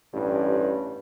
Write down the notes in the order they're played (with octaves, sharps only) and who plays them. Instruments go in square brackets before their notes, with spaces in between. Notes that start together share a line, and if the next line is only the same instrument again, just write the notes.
[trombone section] A1 G2